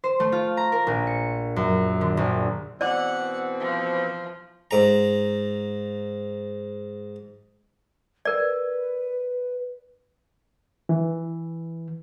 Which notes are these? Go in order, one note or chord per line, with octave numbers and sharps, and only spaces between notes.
C5
A3
F4
A#5
A#4
A#1
C#7
F#2
D3
A#1
B2 E3 C4 D5 F#5 D6
F3
G#2 A#5
A#4 B4 D5
E3